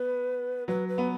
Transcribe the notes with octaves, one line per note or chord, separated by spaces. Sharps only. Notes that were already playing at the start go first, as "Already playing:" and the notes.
Already playing: B3 B4
F#3 B4
B4
B3